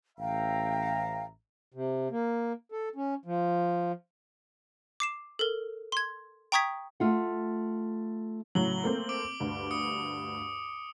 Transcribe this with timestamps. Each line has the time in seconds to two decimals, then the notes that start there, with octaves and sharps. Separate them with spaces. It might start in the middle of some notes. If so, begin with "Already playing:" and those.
0.18 A1 E5 F5 G5 A#5
1.74 C3
2.11 A#3
2.72 A4
2.96 C#4
3.25 F3
5.00 D6 C7 E7
5.39 A4 A#4
5.92 C6 G#6
6.52 G5 A#5 C#6 D#6 G#6 B6
7.00 A3 F4 F#5
8.55 A2 C#3 F#3 F#7 G7
8.84 A3 A#3 C4
9.09 D6 D7
9.40 D2 G2
9.71 D#6 C#7